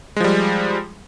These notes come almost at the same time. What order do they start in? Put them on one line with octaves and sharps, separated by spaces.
G#3 F3 G3